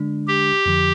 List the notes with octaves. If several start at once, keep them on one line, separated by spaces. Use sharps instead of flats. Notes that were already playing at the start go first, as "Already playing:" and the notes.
Already playing: D3 G#3 D4
G4
F2 D3 F3